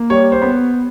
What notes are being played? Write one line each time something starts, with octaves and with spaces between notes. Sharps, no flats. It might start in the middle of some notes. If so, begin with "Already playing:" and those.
Already playing: A#3
G3 C#5
C5
B3